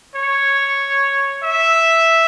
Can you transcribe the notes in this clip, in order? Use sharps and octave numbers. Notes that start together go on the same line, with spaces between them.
C#5
E5